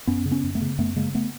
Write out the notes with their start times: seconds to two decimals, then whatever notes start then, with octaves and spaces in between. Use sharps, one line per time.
0.07 F#2 B3 C#4
0.25 C#3
0.31 B3 C#4
0.43 F#2
0.55 A3 B3
0.61 C#3
0.78 F#2 A3 B3
0.96 C#3 G#3 A#3
1.15 A3 B3